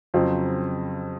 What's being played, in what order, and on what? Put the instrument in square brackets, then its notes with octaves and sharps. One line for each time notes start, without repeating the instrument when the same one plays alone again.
[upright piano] F2 C#3 F#3 C4 F4